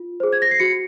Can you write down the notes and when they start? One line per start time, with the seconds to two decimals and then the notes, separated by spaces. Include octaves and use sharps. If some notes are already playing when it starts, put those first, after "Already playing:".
Already playing: F4
0.20 G#4 C5
0.33 G#6
0.42 A#6
0.51 C7
0.59 F#4 C#7